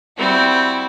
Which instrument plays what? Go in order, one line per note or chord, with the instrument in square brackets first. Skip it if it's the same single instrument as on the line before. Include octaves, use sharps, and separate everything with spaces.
[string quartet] G3 C4 E4 F#4